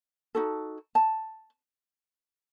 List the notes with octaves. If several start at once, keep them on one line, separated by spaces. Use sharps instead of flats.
D#4 F#4 A4
A5